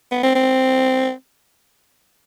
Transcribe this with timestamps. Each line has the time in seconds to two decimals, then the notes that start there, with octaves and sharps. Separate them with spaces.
0.11 B3
0.23 C4
0.35 C4